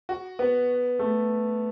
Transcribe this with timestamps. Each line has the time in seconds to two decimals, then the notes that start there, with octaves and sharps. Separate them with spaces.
0.09 F#4
0.39 B3
0.99 A3